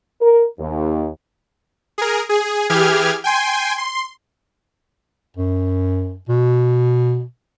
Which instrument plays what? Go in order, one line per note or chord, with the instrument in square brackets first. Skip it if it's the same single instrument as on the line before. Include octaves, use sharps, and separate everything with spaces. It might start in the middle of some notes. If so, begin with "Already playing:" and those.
[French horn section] A#4
D#2
[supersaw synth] G#4 A#4
G#4
E3 G4 G#4 F6 G#6
G5 G#5 C6
C6
[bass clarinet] F#2
B2